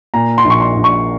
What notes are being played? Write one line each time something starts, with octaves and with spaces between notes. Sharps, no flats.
A#2 A#5
C6
A#1
C#6
C6
A#1
C#6